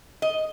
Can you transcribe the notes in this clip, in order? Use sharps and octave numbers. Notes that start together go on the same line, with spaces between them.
D#5